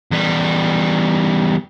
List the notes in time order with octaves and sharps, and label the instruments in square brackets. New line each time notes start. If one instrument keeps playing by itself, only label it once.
[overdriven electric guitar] E2 G3